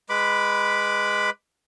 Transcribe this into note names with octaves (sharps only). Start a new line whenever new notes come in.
G#3 B4 B5 D6